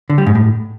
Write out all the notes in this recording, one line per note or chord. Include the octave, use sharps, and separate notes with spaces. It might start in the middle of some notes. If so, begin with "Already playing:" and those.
D3
G3
G#2
A2